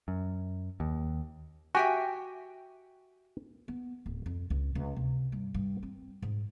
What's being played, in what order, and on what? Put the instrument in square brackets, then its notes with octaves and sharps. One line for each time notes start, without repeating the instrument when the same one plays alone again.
[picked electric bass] F#2
D#2
[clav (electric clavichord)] F#4 G4 [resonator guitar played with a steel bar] E5 G5 G#5
[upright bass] B3
D1
F2
C#2
C#2
C3
G2
G2
C4
G#2